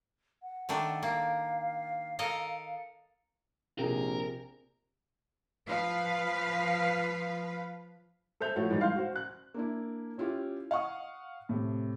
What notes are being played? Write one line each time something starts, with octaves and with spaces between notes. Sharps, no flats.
F#5
D#3 A3 D4
A#3 F5
A4 A#4 D#5
A#1 C3 G#4 A#4
F3 B4 F5
A4 C5 E5 G6 F7
F3 A3 E4 F#4 C#5
E3 G3 G#3 D#4
F5 C6 G6
F#4 C5
F#6
A#3 D4 E4
C#4 E4 F4 G4
F5 F#5 C#6 D#6
A2 C3